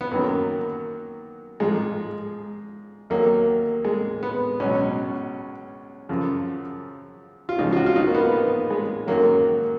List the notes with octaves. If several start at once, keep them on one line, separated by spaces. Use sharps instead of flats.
B3
F#2 D#3 F#3 A#3
G#2 F3 G#3
D#2 D#3 F#3 A#3
G#3
B3
C#2 B2 F#3 C#4
F#2 C#3 F3
F4
C#2 C#3 F3 D#4
F4
F#4
F4
D#4
A#3
B3
B3
G#3
F#2 D#3 F#3 A#3